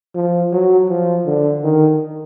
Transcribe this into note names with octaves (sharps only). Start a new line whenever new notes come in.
F3
F#3
F3
D3
D#3